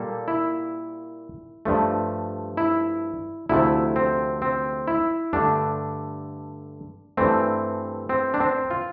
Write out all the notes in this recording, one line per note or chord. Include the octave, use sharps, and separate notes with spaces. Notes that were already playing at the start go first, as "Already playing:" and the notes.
Already playing: A#2 G3 A#3 A4
E4
G2 F3 A3
E4
D2 C3 F3 A3 E4
C4
C4
E4
G2 D3 A3 D4
G2 E3 A3 C4
C4
D4
C4
F4